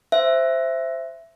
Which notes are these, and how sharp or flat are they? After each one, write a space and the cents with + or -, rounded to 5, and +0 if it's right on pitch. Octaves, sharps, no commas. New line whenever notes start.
C5 +0 E5 +10